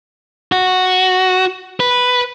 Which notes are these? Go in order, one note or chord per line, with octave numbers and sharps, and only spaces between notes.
F#4
B4